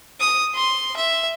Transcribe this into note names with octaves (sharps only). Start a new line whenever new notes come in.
D#6
C6
E5